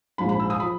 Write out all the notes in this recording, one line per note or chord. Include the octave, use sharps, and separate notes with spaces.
A#1 G#2 F3 B5
B5
E6
D#6
F3 B5